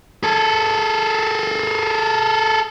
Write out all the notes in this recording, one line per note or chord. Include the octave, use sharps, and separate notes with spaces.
G#4 A4